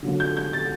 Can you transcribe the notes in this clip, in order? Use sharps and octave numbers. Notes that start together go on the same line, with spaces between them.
D3 F#3 A#3
G6
G6
A6